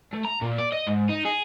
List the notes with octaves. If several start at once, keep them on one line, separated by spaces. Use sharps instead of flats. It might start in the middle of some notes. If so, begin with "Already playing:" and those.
A3
A#5
A#2
D5
D#5
G#2
D#4
G#4